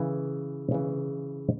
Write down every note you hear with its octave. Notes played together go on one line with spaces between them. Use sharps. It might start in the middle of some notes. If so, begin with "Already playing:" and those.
Already playing: C#3 E3
C#3 E3